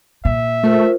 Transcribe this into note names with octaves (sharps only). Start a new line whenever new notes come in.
A#2 E5
A3 F4 A#4 C5